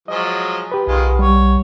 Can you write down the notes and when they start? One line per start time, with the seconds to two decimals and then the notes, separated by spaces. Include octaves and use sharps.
0.08 F3 F#3 G#3 D#5
0.72 G4 B4
0.87 B1 D#3 G#3 F4
1.19 G3 C#5